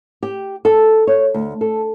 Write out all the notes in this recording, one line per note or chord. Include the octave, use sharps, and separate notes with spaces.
G4
A4
C#5
D2
A4